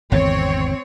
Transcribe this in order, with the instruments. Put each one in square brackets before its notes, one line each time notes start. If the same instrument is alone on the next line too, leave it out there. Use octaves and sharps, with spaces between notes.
[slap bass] G#1 E2 D3 [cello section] C4 C#5